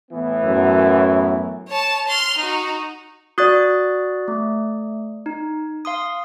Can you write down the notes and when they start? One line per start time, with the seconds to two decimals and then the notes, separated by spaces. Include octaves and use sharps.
0.12 A2 E3 B3
0.45 F#2
1.69 C#5 A5
2.08 C6 F6
2.38 D#4 F#4
3.38 F#4 D5 D#6 F#6 A6
4.28 A3
5.26 D#4
5.85 F5 C6 D#6